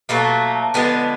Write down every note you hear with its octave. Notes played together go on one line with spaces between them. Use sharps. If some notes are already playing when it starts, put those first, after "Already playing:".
B2 F#3 A3 A#3
D3 F3 G#3 B3